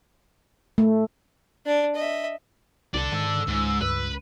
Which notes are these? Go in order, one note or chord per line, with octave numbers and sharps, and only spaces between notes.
A3
D4 D5
D#5 E5
C2 A4 D5
G#2 D#3 E6
C#2 G#2
G2 B4